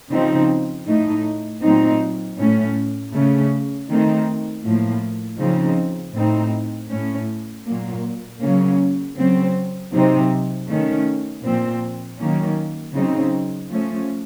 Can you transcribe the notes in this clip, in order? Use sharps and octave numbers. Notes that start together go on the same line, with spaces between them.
C#3 F3 C4 D#4
A2 A3 D#4
A#2 F#3 A3 C4 D#4
A2 A3 C#4
C#3 A3 C#4
D#3 A3 C4 D#4
A2 F3 A#3
C#3 F3 C4 D#4
A2 A3 C4 D#4
A2 A3 C#4
A#2 F#3 A#3
C#3 F#3 A#3 C#4
C#3 F#3 C4
C3 F#3 C4 D#4
D#3 A3 C#4
A#2 F3 C4
D#3 F#3 A#3 C#4
C#3 F#3 C4 D#4
F3 A3 C#4